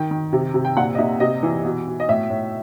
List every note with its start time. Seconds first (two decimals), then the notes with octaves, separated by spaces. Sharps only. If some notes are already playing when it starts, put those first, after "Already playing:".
Already playing: D#3 G5
0.11 D#3
0.33 C3
0.54 C3
0.65 G5
0.77 A#2 F#5
0.95 D#5
0.98 A#2 E5
1.20 C3 D#5
1.43 E3
1.65 B2
1.87 B2
2.00 D#5
2.08 A2 E5
2.30 A2